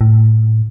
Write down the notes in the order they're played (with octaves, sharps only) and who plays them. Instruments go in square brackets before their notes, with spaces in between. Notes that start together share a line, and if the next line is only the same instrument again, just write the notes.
[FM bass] A2